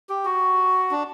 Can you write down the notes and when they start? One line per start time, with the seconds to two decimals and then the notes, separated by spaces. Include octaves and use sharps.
0.09 G4
0.25 F#4
0.91 D4